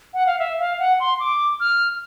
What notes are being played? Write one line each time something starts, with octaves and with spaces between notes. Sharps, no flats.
F#5
F5
E5
F5
F#5
C6
D6
F6